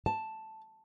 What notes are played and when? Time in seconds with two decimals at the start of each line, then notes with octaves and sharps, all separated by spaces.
0.06 A5